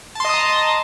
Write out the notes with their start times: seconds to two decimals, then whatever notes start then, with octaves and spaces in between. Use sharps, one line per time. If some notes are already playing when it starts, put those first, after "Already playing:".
0.15 A5
0.20 C6
0.25 D#5
0.29 D#6
0.34 A#5